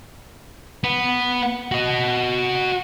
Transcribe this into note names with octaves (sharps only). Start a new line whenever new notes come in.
B3
F#4 D#5